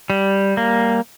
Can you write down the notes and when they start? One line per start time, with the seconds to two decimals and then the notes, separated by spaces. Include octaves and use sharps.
0.10 G3
0.57 A#3